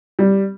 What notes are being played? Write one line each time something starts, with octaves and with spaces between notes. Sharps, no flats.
G3